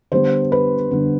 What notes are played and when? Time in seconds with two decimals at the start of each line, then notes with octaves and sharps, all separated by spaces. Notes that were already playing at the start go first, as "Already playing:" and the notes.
0.12 D3 G3 B3 D4 C5
0.52 B4
0.91 D3 G3 B3 D4